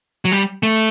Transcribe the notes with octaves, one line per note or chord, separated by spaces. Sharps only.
F#3
G3
A3